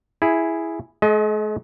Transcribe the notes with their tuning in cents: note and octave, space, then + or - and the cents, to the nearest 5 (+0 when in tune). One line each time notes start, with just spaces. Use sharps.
E4 +0 G#4 +0
G#3 +45 D#5 +20